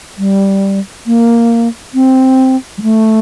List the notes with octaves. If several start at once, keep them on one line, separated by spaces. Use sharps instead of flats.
G3
A#3
C4
G3
A3